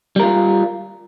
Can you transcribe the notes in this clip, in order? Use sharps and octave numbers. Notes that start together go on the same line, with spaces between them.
G3 F4 A#4